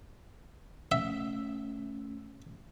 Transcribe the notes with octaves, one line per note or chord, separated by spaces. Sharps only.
A3 C#4 E5